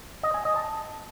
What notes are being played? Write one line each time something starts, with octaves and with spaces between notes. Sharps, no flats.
D#5
G#5
D#5
A5